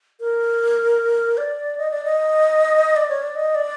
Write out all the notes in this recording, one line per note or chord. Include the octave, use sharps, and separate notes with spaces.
A#4
D5
D#5
D5
D#5
D5
C#5
D5
D#5
D5